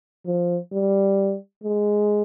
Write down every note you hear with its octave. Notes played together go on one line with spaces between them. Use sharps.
F3
G3
G#3